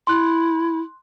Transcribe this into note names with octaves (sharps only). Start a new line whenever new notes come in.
E4 C6 F#6